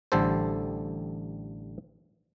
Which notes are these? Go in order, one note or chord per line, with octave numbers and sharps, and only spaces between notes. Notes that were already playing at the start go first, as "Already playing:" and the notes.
A1 D3 G3 A4 C5